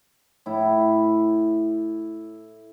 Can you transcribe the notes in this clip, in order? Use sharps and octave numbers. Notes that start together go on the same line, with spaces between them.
A2 E4